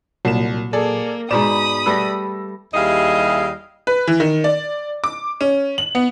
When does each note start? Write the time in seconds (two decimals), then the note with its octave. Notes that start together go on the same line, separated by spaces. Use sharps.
0.25 C2 A#2 F#3 E7
0.73 A#3 G#4 A4 D5
1.31 G#2 B2 C5 D5 B5 D#6 E7
1.86 G3 A3 B4 E6 A#6
2.74 D#2 G3 E4 G#4 D#5 F5
3.87 B4
4.08 E3
4.20 D#3
4.44 D5
5.04 D6
5.41 C#4
5.78 F#7
5.95 B3